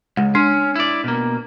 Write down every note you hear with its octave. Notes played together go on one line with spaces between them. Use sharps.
C#2 G#3
C#4 D4
E4 D5
B2 A#3